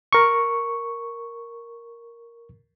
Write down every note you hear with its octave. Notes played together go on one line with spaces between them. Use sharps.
A#4 C#6